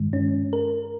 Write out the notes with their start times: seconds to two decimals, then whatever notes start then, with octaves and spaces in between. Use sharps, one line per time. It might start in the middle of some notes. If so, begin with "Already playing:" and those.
Already playing: G2 D#3 G#3
0.13 C#4
0.53 A#4